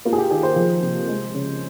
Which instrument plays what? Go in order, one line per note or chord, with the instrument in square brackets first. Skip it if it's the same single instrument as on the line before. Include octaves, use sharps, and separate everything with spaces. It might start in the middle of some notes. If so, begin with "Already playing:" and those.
[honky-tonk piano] A#3 F4
G#4
G4
D#3 G#4
C5
F3
C3
G#3
C#3